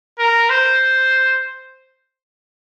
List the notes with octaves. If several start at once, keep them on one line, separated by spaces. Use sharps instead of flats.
A#4
C5